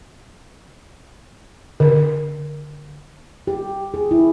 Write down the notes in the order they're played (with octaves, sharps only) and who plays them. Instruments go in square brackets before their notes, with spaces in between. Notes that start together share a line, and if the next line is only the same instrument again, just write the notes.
[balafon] D3
[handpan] G4
G#4
E4